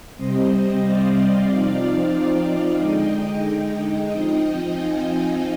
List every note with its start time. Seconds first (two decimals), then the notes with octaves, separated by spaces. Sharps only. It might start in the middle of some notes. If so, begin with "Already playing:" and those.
0.15 C3 G3 C4 C5 D#5
0.81 D5 F5
1.47 F3 C4 D#4
2.78 D3 G#3 D#4 D#5 G5
3.44 D#5 G5
4.10 F3 C4 D#4
4.75 F5 G#5